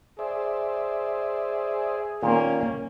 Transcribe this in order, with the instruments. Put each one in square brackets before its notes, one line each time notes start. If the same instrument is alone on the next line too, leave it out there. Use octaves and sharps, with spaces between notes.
[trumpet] G#4 [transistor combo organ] C5 D5 E5
[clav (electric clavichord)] A#2 D#3 [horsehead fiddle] A#3 C#4